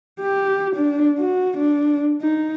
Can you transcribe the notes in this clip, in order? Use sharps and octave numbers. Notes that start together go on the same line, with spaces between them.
G4
D4
F#4
D4
D#4